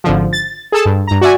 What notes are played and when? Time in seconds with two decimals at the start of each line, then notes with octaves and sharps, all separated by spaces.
0.04 G#1 D3 F3
0.33 A6
0.72 G#4 A4 A5
0.85 G2
1.07 G2 A#5
1.21 F#4 D5 E5 G#5